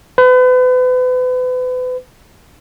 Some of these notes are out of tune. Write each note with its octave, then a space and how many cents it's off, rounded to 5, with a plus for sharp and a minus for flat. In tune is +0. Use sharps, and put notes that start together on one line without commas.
B4 +35